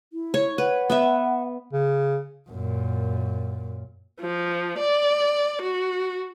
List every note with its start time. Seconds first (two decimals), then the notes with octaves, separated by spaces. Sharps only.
0.13 E4
0.34 C#5
0.58 B4 F#5
0.90 B3 B4 E5
1.73 C#3
2.50 F#2 A#2
4.20 F3
4.79 D5
5.62 F#4